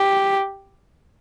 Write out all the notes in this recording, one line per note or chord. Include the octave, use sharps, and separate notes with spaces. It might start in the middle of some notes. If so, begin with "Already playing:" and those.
Already playing: G4